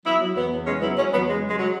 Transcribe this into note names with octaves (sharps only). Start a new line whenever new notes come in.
F#3 B3 E4
F#3
E2 F#3 B3
E2
C#3 G#3 C#4
F#3 B3 E4
F#3 G#3 C#4
E2 F#3 B3
C#3 G#3
F#3
G#3
F#3